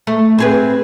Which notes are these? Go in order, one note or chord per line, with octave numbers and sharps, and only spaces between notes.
A3
C4 G#4 B4